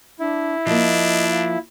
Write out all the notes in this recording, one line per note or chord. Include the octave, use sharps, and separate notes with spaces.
D4 E4
F3 A#3 D4 D#5
F5